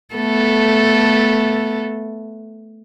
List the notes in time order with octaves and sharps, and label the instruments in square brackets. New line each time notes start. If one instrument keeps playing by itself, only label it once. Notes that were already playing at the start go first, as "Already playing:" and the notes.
[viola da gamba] A3 B3 A4